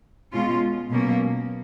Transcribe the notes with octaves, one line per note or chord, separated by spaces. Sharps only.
B2 G#3 C#4 F4
B2 F#3 A#3 C#4